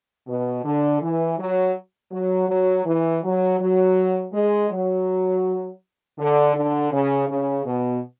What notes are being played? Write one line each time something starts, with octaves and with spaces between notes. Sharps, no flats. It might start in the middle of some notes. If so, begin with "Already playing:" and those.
B2
D3
E3
F#3
F#3
F#3
E3
F#3
F#3
G#3
F#3
D3
D3
C#3
C#3
B2